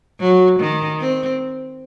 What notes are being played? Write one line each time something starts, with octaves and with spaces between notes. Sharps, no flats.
F#3
D#3
C4